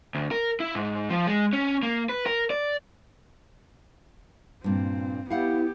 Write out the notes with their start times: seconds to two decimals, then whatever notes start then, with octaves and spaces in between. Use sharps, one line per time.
0.15 D2
0.31 A#4
0.60 E4
0.75 G#2
1.10 F3
1.27 G#3
1.53 C#4
1.83 A#3
2.09 B4
2.26 A#4
2.50 D5
4.64 G2 A#2 C4
5.30 B3 E4 G4 F5 F#5